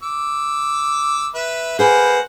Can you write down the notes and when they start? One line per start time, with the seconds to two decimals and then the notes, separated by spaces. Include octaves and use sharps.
0.03 D6 E6
1.34 B4 E5
1.79 A#3 G#4 B4 C5 F#5 G5